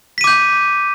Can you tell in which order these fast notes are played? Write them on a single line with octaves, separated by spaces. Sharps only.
B6 D#7 D6 G6